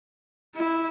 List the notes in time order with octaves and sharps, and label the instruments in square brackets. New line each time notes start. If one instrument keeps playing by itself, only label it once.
[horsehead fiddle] E4